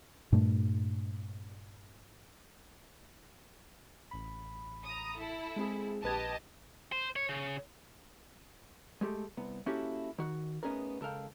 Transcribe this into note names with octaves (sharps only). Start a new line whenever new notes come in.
G2 A#2 A3
A1 B5
A#5 D#6
E4 A4
G#3 C4 G#4
A#1 G4 B4 D#5 A5 G#6
C5
C#5
C#3
G#3 A3 G4 A4
C2 B3
A#3 C#4 E4 F#4 G4 A4
D#3 F#4
A3 B3 C#4 D#4 G#4 A#4
C#2 A4 A#4 F5 G5